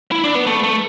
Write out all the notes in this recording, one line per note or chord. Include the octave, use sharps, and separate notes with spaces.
E4
D4
B3
A3
A3